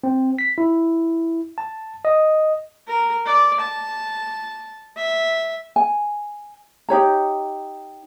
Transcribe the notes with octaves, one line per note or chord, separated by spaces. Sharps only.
C4
B6
E4
A5
D#5
A#4
D5
A5
E5
G#5
D#4 G4 C#5 A#5